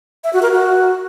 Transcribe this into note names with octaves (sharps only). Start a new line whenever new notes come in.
E5
F#4
A#4
F#4